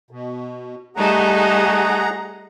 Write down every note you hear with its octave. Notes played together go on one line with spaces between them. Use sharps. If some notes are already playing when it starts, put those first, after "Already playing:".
B2
G3 A3 D#4 G#4 F#5 A#5